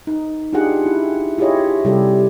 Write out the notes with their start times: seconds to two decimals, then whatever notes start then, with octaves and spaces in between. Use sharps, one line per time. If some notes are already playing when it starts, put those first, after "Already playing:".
0.07 D#4
0.53 D4 D#4 F4 G4 G#4 F#5
0.86 E4
1.38 E4 F4 G4 G#4 C#5 D#5
1.85 C3 G3 G4 A4